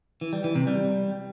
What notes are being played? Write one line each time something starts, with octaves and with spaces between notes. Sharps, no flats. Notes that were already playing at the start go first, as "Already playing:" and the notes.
E3
G3
E3
C3
G3